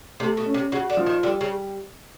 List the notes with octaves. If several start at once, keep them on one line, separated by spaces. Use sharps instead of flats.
C3 A3
B2
C#4
C3
C#3 F#4
D3
F3
D#3
D3 G3
C#3